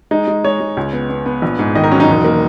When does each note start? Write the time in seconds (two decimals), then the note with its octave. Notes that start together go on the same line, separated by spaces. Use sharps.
0.11 G#3 D#4
0.28 G#3
0.44 G#3 C#5
0.60 G#3
0.77 C#2
0.93 B3
1.10 B3
1.26 B3
1.42 A#1
1.59 G#2
1.75 D#3 D#5
1.84 A#4
1.92 F#3 C#4
2.00 D#4
2.09 E1
2.25 A#3